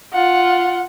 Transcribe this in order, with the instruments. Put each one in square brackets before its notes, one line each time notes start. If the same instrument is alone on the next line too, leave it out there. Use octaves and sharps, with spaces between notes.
[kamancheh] F4 F#5